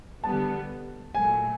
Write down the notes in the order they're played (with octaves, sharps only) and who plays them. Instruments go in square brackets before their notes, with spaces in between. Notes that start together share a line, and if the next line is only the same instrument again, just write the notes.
[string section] D3 G3 B3 [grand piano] A5
[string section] A#2 F#3 A3 [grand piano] G#5